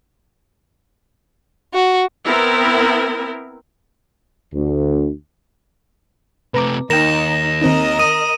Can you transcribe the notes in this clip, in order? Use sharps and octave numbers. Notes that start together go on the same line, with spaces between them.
F#4
B3 C4 E4 A#4
D2
C3 A3 B4 A#5 D6
D#2 D#4 A#4 G5 A#6 E7
D#3 C4 D#4 A#4 D#5
D#6 D#7